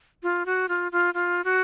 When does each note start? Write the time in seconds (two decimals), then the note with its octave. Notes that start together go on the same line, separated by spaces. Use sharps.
0.23 F4
0.46 F#4
0.69 F4
0.92 F4
1.14 F4
1.45 F#4